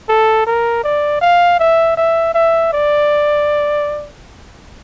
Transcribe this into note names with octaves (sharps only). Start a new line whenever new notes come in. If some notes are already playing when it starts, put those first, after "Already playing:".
A4
A#4
D5
F5
E5
E5
E5
D5